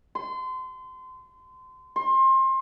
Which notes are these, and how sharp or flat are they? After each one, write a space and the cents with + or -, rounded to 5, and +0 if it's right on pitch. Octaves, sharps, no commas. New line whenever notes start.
C6 -30
C6 +25